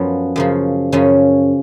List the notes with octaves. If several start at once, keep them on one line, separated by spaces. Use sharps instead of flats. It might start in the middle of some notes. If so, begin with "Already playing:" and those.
Already playing: F#2 F3 B3 C#4
F#2 C#3 F3
F#2 C#3 F3 C#4